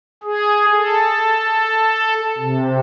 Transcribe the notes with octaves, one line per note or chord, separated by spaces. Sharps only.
G#4
A4
C3